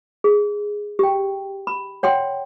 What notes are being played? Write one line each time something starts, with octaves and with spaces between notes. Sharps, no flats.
G#4
G4 G5
B5
C#5 F#5 G5 C6